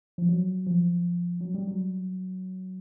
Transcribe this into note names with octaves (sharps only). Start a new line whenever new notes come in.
F3
F#3
F3
F#3
G3
F#3